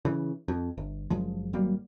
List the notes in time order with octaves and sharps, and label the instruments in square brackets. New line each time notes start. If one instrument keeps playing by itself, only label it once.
[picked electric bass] C#3 E3
F2
G1
F#1 F#2 F3 G#3
G#1 F#3 G3 A#3